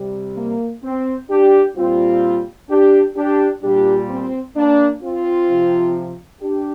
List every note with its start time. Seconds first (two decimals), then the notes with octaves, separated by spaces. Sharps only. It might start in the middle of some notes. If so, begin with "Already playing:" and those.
Already playing: C3 G3
0.37 A#3
0.83 C4
1.30 D4 G4
1.76 A#2 G3 C4 F4
2.69 D4 G4
3.16 D4 G4
3.62 A#2 G3 D4 G4
4.09 C4
4.55 A#3 D4
5.02 C4 F4
5.48 C3 F3
6.41 D4 G4